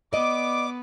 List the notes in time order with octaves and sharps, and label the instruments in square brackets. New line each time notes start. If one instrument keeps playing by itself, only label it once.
[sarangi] B3 [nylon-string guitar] D5 D#5 [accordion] D6